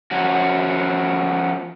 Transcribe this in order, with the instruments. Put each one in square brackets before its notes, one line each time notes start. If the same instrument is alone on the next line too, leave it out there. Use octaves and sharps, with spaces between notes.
[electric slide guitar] F3 C#4 F#4